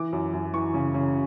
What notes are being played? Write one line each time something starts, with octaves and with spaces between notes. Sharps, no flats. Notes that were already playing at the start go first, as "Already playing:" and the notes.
Already playing: E3 D6
F#2
F#2
E3 C#6
C#3
C#3